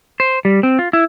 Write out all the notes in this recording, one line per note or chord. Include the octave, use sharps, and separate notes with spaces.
C5
G3
C4
F4
E4